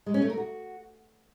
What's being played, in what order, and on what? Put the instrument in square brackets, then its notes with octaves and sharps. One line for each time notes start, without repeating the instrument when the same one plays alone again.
[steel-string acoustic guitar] G#3
C#4
A3
A#4
F#4